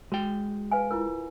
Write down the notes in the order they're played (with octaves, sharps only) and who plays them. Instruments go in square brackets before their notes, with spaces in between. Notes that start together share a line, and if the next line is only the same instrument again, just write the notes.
[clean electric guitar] G#3 G5 [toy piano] F#4
[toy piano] B4 F5 G#5
E4 F4 A#4